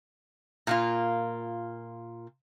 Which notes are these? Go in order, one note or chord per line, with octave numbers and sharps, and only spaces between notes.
A#2 A#3 F4